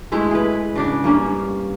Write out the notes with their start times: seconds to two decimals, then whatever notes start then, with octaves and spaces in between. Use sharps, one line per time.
0.12 G#3 A3 E4
0.31 G#4 B4
0.76 C#3 D4 D5
1.04 G2 A#3 C#4